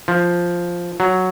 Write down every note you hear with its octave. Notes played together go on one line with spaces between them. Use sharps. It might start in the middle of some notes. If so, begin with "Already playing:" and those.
F3
F#3